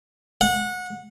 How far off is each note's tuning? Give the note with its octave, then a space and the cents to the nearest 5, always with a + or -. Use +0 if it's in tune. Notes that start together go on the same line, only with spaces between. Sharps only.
F#5 -25